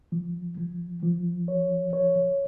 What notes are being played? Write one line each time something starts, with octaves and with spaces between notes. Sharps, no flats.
F3
F3
F3
C#5
C#5